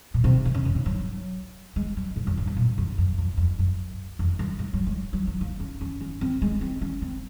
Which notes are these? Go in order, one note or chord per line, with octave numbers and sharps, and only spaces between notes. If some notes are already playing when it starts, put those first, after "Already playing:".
A#2
C3
D#3
C#3
F#2
G#2
F#3
G#3
F#3
G#2
F#2
F2
F#2
A#2
F#2
F#2
F2
F2
F#2
F2
F#2
G#2
F#3
G#3
F#3
F#3
A#3
C#4
C#4
C#4
C4
G#3
C4
C#4
C4